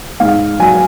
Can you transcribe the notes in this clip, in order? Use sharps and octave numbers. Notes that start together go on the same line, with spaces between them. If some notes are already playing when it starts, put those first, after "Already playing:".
G#2 F5
F#3 G#5